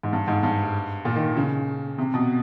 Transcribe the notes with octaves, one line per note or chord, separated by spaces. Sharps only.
G#2
G2
G#2
G2
A#2
D#3
C#3
C3
B2